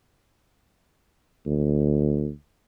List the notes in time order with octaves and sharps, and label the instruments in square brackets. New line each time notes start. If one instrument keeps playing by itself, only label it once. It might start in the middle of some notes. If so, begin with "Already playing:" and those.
[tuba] D2